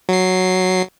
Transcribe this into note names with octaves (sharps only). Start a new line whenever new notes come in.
F#3 C7